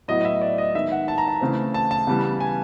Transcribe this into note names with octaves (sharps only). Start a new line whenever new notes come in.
A2 F#3 B3 D#5
D#5
E5
D5
D#5
D#3 G#3 B3 E5
F#5
A5
A#5
A5
C#3 E3 A3 C4
A5
A5
C#3 E3 G3 B3
G#5